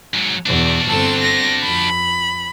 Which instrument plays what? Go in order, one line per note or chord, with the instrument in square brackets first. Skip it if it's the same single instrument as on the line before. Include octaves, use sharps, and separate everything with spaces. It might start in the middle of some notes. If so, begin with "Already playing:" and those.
[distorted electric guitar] G#2 F#3
[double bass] E2 B2 [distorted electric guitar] D4 F#4
[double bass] G1 C4 [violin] A4 A5
[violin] A#6
[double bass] F2 [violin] B5